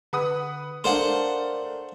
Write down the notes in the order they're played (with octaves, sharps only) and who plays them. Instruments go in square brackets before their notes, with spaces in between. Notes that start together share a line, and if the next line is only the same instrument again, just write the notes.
[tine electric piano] D3 [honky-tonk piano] B4 F#5 D#6
[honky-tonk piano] A3 D4 [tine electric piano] A#4 D5 F5 [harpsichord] C5 F#5